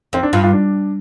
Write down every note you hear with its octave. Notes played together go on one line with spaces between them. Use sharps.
F2 C4
D4
G2 F4
F4
D4